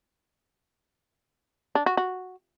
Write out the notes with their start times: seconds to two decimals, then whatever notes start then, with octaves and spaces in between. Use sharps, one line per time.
1.75 D4
1.86 F#4
1.97 F#4